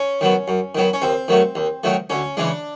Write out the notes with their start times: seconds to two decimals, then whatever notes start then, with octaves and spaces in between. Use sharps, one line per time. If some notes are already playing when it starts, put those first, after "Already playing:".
Already playing: C#4
0.21 D#3 F#3 B3
0.48 F#2
0.75 D#3 F#3 B3
0.94 C#4
1.02 D#2 C4
1.28 D#3 F#3 A3
1.55 D#2
1.84 D#3 F#3 A3
2.10 D2 C#4
2.37 C#3 E3 G#3 D4